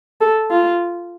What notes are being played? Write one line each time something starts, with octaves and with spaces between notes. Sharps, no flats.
A4
F4